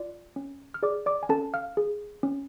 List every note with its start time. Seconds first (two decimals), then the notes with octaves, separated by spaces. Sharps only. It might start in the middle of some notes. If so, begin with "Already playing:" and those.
Already playing: F4 D5
0.36 C#4
0.74 F6
0.83 G#4 D5 D6
1.06 D5 D6
1.23 G#5
1.29 C#4 A4 A5
1.54 F5 F6
1.77 G#4
2.23 C#4